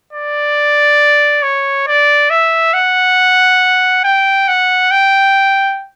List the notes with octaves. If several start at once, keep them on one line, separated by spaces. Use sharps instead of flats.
D5
C#5
D5
E5
F#5
G5
F#5
G5